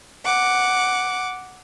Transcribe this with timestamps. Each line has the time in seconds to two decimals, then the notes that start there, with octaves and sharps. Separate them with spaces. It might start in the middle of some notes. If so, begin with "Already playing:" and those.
0.25 F#5 D6